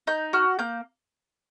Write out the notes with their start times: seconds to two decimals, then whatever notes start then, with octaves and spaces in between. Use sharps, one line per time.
0.07 D#4 G6
0.33 F#4 F6
0.59 A#3 G6